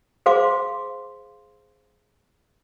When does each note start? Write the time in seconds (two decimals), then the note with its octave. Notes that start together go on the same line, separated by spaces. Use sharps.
0.26 G#4 C5 F5 C6 D6